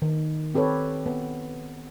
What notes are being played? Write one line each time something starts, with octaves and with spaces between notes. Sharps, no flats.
D#3
C4 G4 A4 B4 C#5
B3